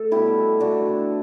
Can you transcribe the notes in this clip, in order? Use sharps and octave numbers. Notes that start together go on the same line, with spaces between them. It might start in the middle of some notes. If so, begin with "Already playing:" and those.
Already playing: A3 A4
B2 G3 B3 E4 G4
D3 A3 D4 F#4